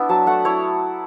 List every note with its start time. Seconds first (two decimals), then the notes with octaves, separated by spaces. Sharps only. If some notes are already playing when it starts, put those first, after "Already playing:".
Already playing: B3 D4 E4 D5 E5
0.09 F#3 A5
0.27 A3 F#5
0.45 E4 C#5